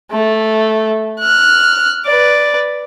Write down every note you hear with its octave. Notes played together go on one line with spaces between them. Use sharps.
A3
F6 F#6
B4 D5